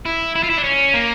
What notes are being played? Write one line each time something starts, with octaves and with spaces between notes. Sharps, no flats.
E4
E4
F4
E4
D4
C#4
A#3